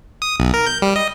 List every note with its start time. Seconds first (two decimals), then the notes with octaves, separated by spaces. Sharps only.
0.22 D#6
0.40 B1
0.54 A#4
0.66 G6
0.82 G3
0.96 D#5